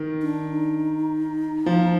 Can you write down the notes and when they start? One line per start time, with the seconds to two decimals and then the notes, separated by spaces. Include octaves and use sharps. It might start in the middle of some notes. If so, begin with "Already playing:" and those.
Already playing: D#3
0.22 D4
0.52 D#4
1.66 F3